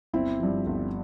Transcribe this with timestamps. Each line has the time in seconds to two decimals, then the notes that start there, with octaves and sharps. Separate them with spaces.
0.13 G1 C4 E4
0.40 G2 F3
0.67 G1